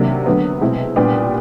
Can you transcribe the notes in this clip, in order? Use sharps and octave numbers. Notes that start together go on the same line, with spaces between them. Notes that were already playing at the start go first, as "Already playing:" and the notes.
Already playing: C3 D#3 F#3 A#3 D4
D3 F#3 B3
B2 G#3 C4 E4
A#2 G3 B3 D4 G4